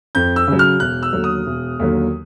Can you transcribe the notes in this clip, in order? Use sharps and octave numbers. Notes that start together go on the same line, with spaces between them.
F2 G6
E6
C#3 F#3
F6
E1 F#6
E6
D#2 D3 F#3
D#6
E1
D#2 D3 F#3